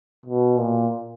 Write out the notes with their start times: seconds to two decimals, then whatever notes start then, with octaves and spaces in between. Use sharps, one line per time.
0.26 B2
0.58 A#2